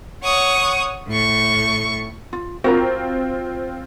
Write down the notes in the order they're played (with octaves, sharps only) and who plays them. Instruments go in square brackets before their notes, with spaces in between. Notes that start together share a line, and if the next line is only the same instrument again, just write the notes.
[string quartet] C#5 F#5 C#6 D#6
A2 C#6
[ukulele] F4
[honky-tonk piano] C4 F4 [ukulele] F#4 A#4 A#5